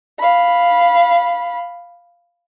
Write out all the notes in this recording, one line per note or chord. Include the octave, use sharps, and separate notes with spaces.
F5 B5